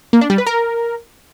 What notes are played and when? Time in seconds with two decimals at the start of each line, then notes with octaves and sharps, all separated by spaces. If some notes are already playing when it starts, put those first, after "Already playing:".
0.13 A#3
0.21 D4
0.30 G3
0.38 B4
0.46 A#4